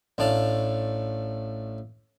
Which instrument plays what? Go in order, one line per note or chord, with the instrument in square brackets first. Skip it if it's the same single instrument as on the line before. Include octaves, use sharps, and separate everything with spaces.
[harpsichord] A1 A2 D4 F5 A5